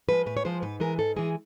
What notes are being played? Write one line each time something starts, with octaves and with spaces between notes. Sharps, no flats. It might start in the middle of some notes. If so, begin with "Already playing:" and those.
F3 G#3 B4
A2 B4
C#5
F3 G#3 C5
G#2 B4
E3 G#3 A#4
G#2 A4
E3 G#3 G#4